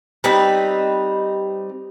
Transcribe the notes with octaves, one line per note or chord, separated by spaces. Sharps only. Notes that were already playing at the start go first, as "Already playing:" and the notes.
G3 C4 D#4 B4